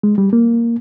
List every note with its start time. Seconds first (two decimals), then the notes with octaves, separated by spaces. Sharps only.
0.03 G#3
0.18 G3
0.33 A#3